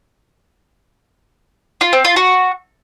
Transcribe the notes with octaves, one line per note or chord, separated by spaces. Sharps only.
F4
C4
F4
F#4